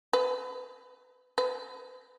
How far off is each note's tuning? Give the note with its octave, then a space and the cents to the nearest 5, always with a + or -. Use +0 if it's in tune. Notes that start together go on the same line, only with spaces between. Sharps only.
B4 +30
B4 +35